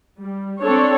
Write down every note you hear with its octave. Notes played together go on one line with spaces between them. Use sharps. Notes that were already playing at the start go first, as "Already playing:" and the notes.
G3
C4 D4 A4 C#5